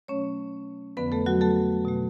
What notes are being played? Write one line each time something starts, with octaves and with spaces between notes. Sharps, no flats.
B2 F#3 A3 C#4 C#5
F2 D3 F3 B3 B4
A3 A4
F#3 F#4
A3 A4
B2 A3